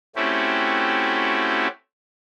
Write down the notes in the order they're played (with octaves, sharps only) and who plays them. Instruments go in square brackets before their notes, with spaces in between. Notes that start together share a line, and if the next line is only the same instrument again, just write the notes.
[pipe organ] A3 C4 C#4 E4 F#4 G4